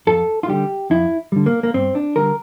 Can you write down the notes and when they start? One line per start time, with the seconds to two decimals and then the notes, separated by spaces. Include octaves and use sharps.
0.07 F2 A4
0.43 F4
0.48 D3 G3 G4
0.90 F2 E4
1.32 D3 G3
1.46 A#3
1.63 A#3
1.74 G2 C4
1.95 D4
2.16 D3 G3 A#4